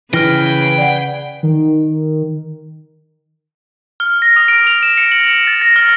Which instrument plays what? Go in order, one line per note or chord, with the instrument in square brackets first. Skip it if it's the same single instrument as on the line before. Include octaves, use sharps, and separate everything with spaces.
[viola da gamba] C#3 G#4 B4 [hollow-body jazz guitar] E3 [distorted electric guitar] G5 [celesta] F6 A#6
[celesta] D5 F#5
[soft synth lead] D#3
[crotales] F6
A#6
D#6
D7
F7
E7
C#7
F#7
C#7
A6
A#6
F6